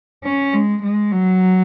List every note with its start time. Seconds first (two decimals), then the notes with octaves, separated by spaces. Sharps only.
0.24 C#4
0.54 G#3
0.83 G#3
1.12 F#3